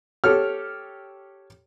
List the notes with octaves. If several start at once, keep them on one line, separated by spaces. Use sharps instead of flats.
G4 A4 C#5 F6